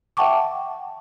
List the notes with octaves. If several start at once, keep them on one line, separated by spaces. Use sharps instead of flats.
E5 F#5 G5 A5 C#6 D6